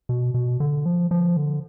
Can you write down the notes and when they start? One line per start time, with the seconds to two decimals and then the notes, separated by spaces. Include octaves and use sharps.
0.09 B2
0.34 B2
0.60 D3
0.86 F3
1.11 F3
1.37 D3